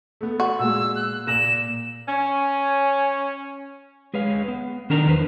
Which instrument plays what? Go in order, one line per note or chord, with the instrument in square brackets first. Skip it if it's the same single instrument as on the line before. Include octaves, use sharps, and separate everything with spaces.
[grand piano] A3 B3
[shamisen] F#4
[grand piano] A#2 G#3 [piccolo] E6
[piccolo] F#6
[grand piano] A#2 A#6 F#7 [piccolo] E7
[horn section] C#4
[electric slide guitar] G#3 G#4 B4 C#5 F5
B3
D#3 D4 A#4 A#5
E2 B4 C5